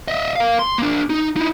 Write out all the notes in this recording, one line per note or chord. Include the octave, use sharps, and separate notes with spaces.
D#5 E5
A#4 F5
C6
A#3 D4
D#4
D#4 E4